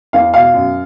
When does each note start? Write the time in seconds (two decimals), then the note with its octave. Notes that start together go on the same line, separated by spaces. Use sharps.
0.13 E2 F5
0.34 B2 F5
0.54 F#2